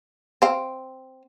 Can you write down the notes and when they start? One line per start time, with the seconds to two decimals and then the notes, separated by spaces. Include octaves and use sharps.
0.42 C4 F5